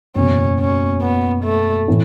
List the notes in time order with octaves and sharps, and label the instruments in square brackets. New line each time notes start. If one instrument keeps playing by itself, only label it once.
[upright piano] F#1 E2 B2 [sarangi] C#4
[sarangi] C#4
B3
A3
[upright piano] A2 E3